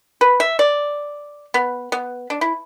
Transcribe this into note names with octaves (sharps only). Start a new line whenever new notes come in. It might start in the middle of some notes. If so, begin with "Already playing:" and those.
B4
E5
D5
B3
B3
D4
E4